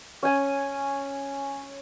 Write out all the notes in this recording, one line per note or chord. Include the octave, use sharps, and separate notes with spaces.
C#4 G#5